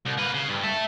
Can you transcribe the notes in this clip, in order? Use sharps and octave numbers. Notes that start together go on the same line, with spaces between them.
C2
A#3 B4
C#3
G2
E5 A5